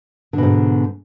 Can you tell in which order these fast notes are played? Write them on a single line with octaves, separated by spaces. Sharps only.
D3 B2 G#2